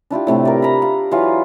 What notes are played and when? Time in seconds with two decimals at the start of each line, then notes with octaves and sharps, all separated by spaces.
0.10 D4 E4 F4 G4
0.27 A2 C3 A3
0.45 A#4 D5
0.62 A#5 B5
0.82 F5
1.11 E3 F#3 E4 F4